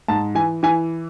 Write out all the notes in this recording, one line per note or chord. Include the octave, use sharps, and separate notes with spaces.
G#2 A5
E3 G#5
E3 G#5